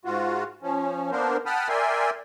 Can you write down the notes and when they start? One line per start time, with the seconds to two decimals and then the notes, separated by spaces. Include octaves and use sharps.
0.05 G#2 F4 F#4
0.62 F3 C#4
1.11 A#3 B3 D4 A#4 C5
1.46 F#5 G5 A5 B5 D#6 F6
1.69 A#4 D5 E5 G5 G#5 C6